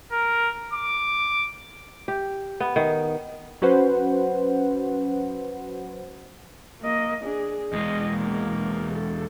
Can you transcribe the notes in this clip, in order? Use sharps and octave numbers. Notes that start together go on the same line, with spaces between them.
A#4
D6
G4
B3
D#3
F#3 C#4 F#4 B4 C5 F#5
A#3 D#5
D4 G#4
E2 G#3 D#5
A#3
A4